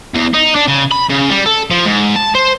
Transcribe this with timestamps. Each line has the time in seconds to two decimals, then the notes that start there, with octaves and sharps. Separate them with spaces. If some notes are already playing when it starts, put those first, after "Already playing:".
0.15 E2
0.34 D#4
0.56 D4
0.68 C#3
0.91 B5
1.09 C#3
1.29 G3
1.46 A4
1.71 F3
1.86 G#2
2.16 A5
2.35 C5